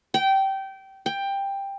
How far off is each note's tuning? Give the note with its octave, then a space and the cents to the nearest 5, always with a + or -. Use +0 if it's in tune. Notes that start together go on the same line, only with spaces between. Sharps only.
G5 -20
G5 +10